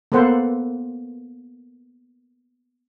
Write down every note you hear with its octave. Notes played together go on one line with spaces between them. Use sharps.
A#3 B3 A4 C5 F#5